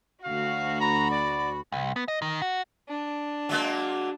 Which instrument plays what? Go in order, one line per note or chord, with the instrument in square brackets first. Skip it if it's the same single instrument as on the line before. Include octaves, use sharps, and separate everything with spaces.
[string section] D2 F#4 [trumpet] F5
[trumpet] A#5 [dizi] B5
[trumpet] D5
[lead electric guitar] C2
B3
D#5
D#3
F#4
[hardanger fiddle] D4
[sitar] F#3 G#3 A#3